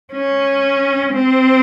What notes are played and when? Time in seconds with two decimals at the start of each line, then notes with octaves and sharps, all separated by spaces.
0.13 C#4
1.14 C4